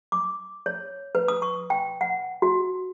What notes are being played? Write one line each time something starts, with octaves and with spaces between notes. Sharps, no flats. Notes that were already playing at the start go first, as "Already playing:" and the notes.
D6
C#5
B4
D#6
C#6
G5
F#5
F#4